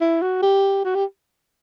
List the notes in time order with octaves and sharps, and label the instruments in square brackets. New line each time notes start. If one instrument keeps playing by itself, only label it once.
[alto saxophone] E4
F#4
G4
F#4
G4